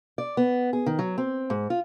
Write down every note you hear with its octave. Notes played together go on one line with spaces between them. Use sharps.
D5
B3
G#4
D#3
F#3
C4
G#2
F4